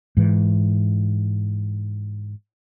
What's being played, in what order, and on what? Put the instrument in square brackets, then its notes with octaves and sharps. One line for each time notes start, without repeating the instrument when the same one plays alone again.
[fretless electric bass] G#2 E3